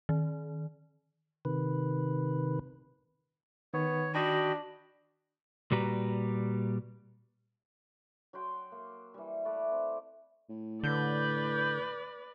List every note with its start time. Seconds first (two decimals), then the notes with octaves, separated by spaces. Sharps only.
0.09 D#3
1.45 C3 D#3 B4
3.74 D#3 B3 C#5
4.15 D4 F#4 D#5 G5 B5
5.71 A#2 G3 F#4 G4 B4 A#5
8.33 F#3 F#5 G5 C6
8.72 A#3
9.14 E3 G3
9.45 A3 B4 D5
9.72 C4
10.49 A2
10.83 D3 B4 D5 G6